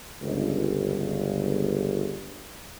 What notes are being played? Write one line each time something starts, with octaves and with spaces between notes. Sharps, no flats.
G1 C#2